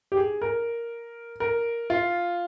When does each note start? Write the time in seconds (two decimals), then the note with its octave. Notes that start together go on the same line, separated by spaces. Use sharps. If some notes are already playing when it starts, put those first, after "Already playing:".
0.12 G4
0.17 G#4
0.42 A#4
1.40 A#4
1.90 F4